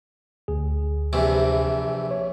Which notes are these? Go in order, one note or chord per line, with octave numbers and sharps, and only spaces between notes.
D2 G#4
A#1 C3 E3
C#5